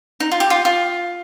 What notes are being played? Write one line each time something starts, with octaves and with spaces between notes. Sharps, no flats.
D#4
F4
G4
F4
F4